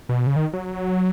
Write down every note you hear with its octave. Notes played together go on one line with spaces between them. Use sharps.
B2
C#3
D#3
F#3